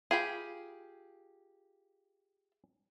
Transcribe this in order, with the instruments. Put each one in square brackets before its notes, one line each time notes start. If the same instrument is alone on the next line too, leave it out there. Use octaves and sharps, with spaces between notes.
[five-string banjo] F4 G4 B5 [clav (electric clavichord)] G#4